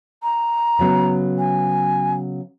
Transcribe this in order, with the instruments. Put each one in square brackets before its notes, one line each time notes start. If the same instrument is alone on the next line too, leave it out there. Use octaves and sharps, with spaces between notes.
[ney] A#5
[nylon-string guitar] C#3 F#3 B3
[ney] G#5